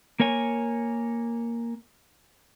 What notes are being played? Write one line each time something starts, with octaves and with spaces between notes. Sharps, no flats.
A#3 A#4 C#5 G#5